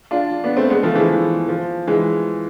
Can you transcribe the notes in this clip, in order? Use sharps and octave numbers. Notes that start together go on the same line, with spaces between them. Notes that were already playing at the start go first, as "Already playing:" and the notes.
D4 F4
B3 D4
A3 C4
G#3 B3
F3 A3
E3 G#3
E3
F3
E3 G#3